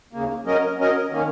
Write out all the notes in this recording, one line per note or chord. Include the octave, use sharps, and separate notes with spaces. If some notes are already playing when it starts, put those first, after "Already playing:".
D#2 C#3 A#3
F#3 C#4 A#4 D#5
F#3 C#4 A#4 D#5
D#3 A#3 C#4